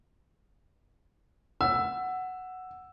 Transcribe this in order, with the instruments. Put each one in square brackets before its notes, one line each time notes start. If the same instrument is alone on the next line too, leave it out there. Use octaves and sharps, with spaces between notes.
[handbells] F#5 [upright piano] E6